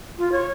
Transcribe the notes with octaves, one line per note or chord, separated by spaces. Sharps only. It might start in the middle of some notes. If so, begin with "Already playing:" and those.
F4
C#5